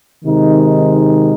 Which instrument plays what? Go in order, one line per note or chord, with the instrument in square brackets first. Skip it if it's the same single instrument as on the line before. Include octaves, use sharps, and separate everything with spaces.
[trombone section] C3 D#3 G#3 D#4